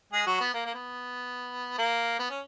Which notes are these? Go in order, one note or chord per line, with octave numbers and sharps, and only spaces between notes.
G#3 G#4
F#3 F#4
B3
A#3
A#3
B3
A#3
B3
C#4